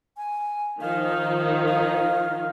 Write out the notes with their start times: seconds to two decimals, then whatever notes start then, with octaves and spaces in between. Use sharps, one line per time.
0.17 G#5
0.81 D#3 F3 D#4 F5
1.68 F5